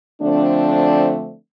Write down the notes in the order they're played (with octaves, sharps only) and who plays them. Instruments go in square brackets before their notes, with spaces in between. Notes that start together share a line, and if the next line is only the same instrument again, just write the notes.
[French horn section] D3 F3 A3 C4 D4